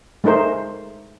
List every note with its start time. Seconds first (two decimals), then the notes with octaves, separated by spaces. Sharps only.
0.24 G#3 A3 D#4 A#4 C5